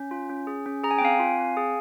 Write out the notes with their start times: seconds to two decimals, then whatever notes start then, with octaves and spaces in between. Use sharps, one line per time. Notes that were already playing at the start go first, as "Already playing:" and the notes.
Already playing: C#4
0.11 F4
0.30 C#4
0.47 G#4
0.66 C#4
0.84 G#4 A#5
0.91 G#5
0.98 G5
1.01 C4 F5 G#5
1.19 F4
1.38 C4
1.57 G#4